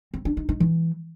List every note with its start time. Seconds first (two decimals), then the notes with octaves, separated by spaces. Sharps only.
0.14 C4
0.25 D4
0.37 D#4
0.49 D#4
0.60 E3